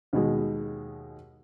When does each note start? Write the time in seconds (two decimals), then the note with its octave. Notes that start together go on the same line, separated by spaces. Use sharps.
0.13 D#2 B2 G#3